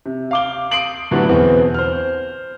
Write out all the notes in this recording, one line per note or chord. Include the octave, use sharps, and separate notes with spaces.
C3
F5 D6 G7
C6 D#6 C7 D7 F#7
A2 D3 F#3 G3 B3
E2 B2 E3 B3 C4
C5 F6